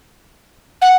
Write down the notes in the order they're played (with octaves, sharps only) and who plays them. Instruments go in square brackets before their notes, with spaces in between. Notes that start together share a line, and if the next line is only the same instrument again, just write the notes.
[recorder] F#5